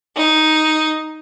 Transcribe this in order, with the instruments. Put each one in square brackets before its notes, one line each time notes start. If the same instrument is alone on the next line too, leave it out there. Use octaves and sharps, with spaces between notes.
[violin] D#4